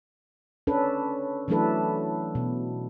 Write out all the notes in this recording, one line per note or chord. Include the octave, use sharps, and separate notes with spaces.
C#4 D4 A4 B4
E3 F#3 A3 D4 A4 B4
B2